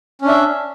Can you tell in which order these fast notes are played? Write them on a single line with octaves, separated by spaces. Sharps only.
C#4 D4 E5